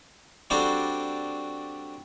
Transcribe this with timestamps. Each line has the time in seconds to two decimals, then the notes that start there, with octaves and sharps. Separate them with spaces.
0.50 G3 C4 D4 F#4 A4 C5